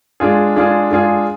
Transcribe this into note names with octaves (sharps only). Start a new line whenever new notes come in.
G#3 D4 F4 G#4
G#3 D4 F4 G#4
G#3 D4 F4 G#4